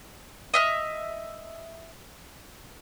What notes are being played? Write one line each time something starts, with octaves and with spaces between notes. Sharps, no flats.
D#5 E5 F6